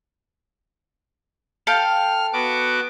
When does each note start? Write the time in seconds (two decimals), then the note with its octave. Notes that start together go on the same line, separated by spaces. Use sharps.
1.67 A4 F5 G5 F6
2.33 B3 F#4 D6